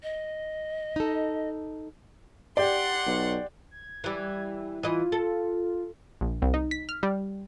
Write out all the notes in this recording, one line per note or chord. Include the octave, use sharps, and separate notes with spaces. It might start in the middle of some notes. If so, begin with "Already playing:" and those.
D#5
D#4 A4
G4 D5 F#5 C6
B1
G#6
E3 G3
E3 F4 D#5
A4
A#1
C2
D#4
B6
F6
G3